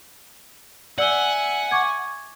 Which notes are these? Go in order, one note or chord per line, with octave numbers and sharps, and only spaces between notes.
D5 E5 F#5 G#5 E6 G7
C#6 D6 G#6